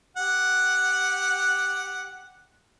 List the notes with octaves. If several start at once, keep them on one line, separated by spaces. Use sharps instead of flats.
G4 F#5